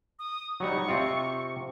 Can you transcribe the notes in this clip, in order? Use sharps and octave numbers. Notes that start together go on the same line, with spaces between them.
D#6
F#3 G3 D#4 C#6
C3 C4 F4